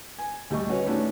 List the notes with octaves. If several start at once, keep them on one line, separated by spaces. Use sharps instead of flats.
G#5
D2 G3 D#5 C#6
C#4 F#4 B4 C#5
A2 D#3 A3 B3 C#4 D4